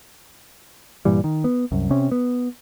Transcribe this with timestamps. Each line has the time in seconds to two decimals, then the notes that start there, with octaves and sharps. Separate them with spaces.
1.05 G2 A#2 E3 G3
1.24 D#3
1.44 B3
1.72 C2 F#2
1.90 C3 C4 C#4
2.12 B3